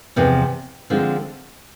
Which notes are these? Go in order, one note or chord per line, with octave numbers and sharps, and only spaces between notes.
E2 C3 F3
D3 F3 G#3 C4 F4